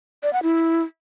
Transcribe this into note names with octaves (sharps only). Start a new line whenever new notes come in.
D5
F#5
E4